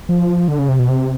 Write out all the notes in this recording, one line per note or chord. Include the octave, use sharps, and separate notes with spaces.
F3
D3
C#3
C3
B2
C3